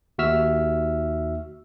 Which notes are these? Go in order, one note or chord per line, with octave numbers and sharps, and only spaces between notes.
D#2 F#4 E5 E6 F6